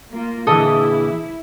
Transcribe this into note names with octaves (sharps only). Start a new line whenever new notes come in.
A#3 F4
A#2 D3 E3 E4 G#4 A4 D#5 D#6